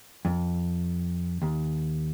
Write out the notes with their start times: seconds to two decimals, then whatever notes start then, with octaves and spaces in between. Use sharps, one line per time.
0.25 F2
1.42 D#2